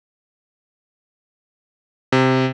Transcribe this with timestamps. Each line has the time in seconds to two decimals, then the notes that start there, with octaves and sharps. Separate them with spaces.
2.12 C3